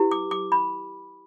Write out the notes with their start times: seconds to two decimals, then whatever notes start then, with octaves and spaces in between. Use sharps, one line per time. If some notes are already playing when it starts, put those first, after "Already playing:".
Already playing: E4 G4 B4
0.11 D6
0.31 D6
0.52 B5